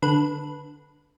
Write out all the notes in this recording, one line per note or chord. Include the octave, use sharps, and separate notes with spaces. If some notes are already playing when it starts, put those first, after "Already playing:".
D3 B4